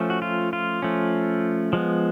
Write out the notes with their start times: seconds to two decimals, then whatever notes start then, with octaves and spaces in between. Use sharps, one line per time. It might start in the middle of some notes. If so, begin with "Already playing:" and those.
Already playing: F3 A3 C#4
0.10 F#4
0.22 F4
0.53 F4
0.82 F3 A3 C#4
1.73 F3 G#3 B3